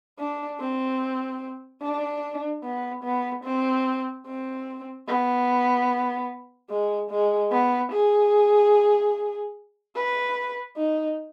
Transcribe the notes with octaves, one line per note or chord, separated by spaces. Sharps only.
D4
C4
D4
B3
B3
C4
C4
B3
G#3
G#3
B3
G#4
B4
D#4